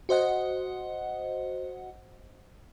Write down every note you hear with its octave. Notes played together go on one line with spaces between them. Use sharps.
F#4 C5 D#5 F#5